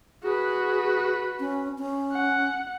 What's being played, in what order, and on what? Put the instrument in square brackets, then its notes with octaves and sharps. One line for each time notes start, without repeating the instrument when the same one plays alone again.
[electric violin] F#4 B4 [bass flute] G#4
[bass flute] C#4
C#4
[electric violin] F#5